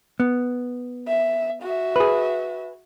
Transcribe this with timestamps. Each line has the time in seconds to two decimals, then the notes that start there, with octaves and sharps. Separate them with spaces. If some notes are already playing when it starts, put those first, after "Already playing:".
0.20 B3
1.08 E5
1.63 F#4 E5
1.96 G#4 B4